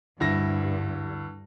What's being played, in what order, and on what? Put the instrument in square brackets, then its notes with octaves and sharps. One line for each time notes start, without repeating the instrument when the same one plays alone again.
[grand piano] D2 E4 A#6 [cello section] G2